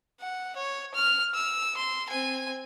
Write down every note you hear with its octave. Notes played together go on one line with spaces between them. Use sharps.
F#5
C#5
F6
E6
C6
C4 G#5